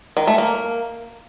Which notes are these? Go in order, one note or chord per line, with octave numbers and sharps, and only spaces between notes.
D#3
A3
A#3